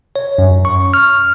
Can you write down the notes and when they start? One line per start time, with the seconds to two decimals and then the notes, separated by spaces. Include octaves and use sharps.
0.16 C#5
0.38 F#2
0.65 C#6
0.94 F6